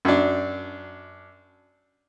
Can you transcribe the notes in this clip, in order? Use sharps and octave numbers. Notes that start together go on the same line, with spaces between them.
F#2 D4